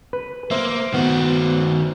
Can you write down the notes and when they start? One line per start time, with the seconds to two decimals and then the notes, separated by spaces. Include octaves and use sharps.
0.13 B4
0.51 A#3 C5 E5
0.94 D#3 B3 F#4